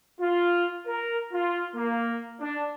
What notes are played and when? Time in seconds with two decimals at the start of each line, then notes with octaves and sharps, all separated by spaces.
0.21 F4
0.87 A#4
1.32 F4
1.75 A#3
2.41 D4